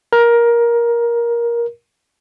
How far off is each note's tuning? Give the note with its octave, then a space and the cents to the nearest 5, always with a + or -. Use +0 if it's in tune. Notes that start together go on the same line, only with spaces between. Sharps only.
A#4 +15